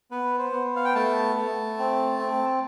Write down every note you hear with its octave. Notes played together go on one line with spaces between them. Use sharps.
B3 B4
C5
B3
F5
G5
A3 A5
A3
C4
C4